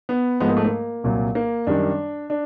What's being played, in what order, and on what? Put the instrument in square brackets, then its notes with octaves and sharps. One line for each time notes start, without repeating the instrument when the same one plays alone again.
[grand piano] B3
G#2 F3 G#3 B3
A#3
A3
A#3
C2 A#2 F#3
A#3
F#2 D#3 G3 D4
D4